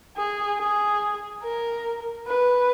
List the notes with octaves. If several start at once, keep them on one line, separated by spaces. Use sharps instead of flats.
G#4
G#4
A#4
B4